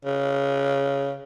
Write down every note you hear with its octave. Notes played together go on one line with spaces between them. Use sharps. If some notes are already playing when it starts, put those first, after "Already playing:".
C#3